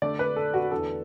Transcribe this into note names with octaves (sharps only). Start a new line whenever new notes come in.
D3 A3 D4 D5
B4
A4
F#4
E2 D3 A3 A4